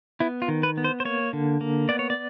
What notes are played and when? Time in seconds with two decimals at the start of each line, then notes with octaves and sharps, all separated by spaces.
0.20 B3 E4
0.42 F4
0.48 D#3
0.63 B4
0.77 B3
0.84 C5
1.00 C5
1.05 A#3 C#5
1.33 D3
1.61 A#3
1.89 B3 D5
1.99 C#5
2.10 D5